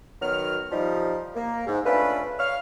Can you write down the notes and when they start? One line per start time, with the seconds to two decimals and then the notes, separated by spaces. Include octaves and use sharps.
0.21 D#3 F#3 B3 F6
0.71 F3 G3 D#4
1.35 A#3
1.66 G#2
1.85 A3 C#4 D4 F4 B4
2.39 C#5 F5 F6